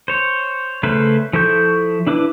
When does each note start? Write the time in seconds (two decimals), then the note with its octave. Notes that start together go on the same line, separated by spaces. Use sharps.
0.08 C5 C#5
0.83 C#3 A3 C#4 B4 C5
1.33 F3 E4 A4 C#6 G6
2.07 D4 E4 B4 D6